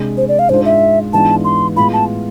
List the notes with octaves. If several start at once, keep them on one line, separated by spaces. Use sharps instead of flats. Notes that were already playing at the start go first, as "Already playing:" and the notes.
Already playing: C3 G#3 D4
C5
D5
F5
G#2 G#3 D4 F4 C5
E5
G#2 E3 B3 D4 F4 A5
C6
A2 G#3 B3 F4 B5
A5